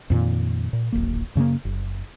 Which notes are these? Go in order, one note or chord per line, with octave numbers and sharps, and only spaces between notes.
F2 A#2 D#3
A#2
D1 G#1 A#3
F#2 C#3 A3 A#3
F#1